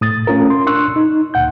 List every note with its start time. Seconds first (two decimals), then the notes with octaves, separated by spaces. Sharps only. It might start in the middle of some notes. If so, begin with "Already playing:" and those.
0.01 A2 D#6 A6
0.27 A3 C#4 F4 A#4
0.50 C6
0.67 D4 C6 C#6 E6 F#6
0.96 D#4
1.34 D2 A#2 F#5 G6